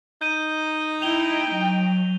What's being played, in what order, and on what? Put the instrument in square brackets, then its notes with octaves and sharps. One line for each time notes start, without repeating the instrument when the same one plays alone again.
[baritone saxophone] D#4 [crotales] G6 D#7
[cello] E4 [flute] G5 [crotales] F7 G7
[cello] F#3